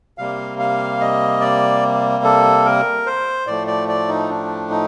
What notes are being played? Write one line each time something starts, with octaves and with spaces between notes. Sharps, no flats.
C3 G3 A#3 F5
F5
D#5
D5
A4
A#4
C5
A2 F3 A3 D5
D5
D5
D#4
D4
D#4